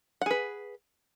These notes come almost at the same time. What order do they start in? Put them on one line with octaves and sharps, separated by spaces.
F#5 G#4 B4